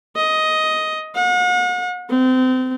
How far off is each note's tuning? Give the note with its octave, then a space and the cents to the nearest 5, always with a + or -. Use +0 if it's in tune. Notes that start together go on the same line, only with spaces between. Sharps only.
D#5 +10
F#5 -40
C4 -30